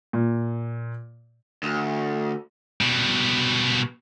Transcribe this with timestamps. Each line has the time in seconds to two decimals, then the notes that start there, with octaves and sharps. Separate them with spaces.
0.13 A#2
1.63 D2
2.81 B2 G3